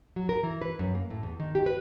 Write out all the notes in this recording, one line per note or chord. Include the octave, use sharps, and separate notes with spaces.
F#3
A#4
E3
B4
F#2
A#3
A2
E2
D#3
G4
B4